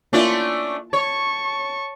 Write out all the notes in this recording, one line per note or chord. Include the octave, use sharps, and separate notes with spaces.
A3 A#3 C#4 D4 E4 F4
C#5 A5 C#6